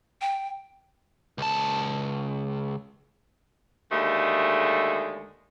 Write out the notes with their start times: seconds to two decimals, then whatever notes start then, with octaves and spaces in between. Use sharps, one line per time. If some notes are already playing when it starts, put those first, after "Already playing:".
0.21 G5
1.38 C#2 A5
3.92 D#2 D3 G#3 A3